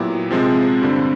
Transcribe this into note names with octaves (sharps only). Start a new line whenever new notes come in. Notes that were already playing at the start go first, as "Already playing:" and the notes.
Already playing: A#2 F#3 B3 E4 G4
C3 F3 G#3 C4
G2 D3 G3 C4